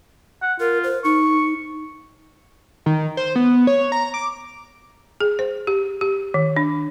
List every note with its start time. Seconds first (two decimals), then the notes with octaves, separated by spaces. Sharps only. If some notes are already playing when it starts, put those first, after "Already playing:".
0.42 F#5
0.60 F4 A#4
0.84 C5
1.04 D#4 C#6
2.86 D#3
3.17 C5
3.36 B3
3.67 C#5
3.92 A#5
4.14 D6
5.21 G#4
5.39 C5
5.67 G4
6.01 G4
6.34 D#3
6.56 D4